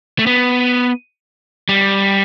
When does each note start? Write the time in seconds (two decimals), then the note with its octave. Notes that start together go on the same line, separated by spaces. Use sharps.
0.19 A3
0.27 B3
1.69 G3